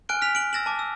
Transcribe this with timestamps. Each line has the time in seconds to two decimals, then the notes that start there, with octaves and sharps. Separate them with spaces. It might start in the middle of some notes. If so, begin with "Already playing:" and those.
0.09 G#5 F6 F#6 D7 G7
0.22 F6 B6 F7
0.35 D7 F#7
0.53 E6 A6 A#6 E7 F#7
0.66 A5 D6
0.79 E6